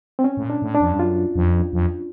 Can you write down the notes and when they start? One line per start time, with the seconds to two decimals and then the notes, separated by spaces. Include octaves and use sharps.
0.19 C4
0.24 C#4
0.37 A2
0.43 A#2
0.50 D4
0.62 A2
0.75 D4
0.80 F2
0.92 G2
0.99 F#2 F4
1.36 F2
1.73 F2